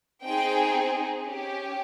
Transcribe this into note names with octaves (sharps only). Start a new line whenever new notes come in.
C4 D#4 G#4 G5
C#4 G4